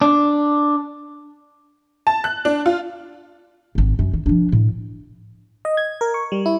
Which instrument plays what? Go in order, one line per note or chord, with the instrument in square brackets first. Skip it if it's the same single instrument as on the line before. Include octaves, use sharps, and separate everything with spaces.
[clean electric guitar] D4
[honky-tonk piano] A5
F#6
D4
F4
[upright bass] G#1 G#2
F#2
D#3
F3 D4
A2
[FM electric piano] D#5
G#6
A#4
C#6
G3
E4